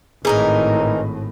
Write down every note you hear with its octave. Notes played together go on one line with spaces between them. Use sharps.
G#1 A2 E3 D#4 G#4 A#4 A#5